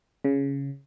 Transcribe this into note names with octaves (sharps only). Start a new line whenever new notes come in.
C#3